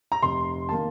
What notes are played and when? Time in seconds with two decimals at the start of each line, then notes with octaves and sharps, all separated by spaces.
0.12 A#5
0.22 F1 C6
0.69 D#3 A#3 A5